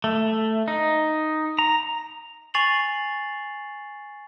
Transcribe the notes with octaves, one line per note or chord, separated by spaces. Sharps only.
A3
D#4
A#5
G#5 C#6 A6 C7 F7 F#7